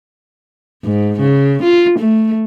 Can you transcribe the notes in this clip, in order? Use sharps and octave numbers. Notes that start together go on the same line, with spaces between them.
G#2
C#3
F4
A3